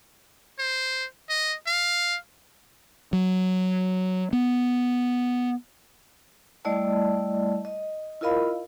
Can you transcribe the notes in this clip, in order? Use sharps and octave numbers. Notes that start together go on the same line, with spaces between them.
C5
D#5
F5
F#3
B3
G3 A3 E4 D5 D#5 A5
D#5
E4 F4 A#4 D#5 F5 B5